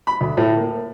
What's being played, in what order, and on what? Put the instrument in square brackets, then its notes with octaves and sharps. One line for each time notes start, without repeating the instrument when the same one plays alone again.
[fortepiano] B5
D2
A2
A#3